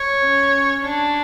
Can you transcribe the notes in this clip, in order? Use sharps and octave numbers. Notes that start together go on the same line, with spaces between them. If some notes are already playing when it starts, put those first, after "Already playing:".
Already playing: C#5
C#4
D4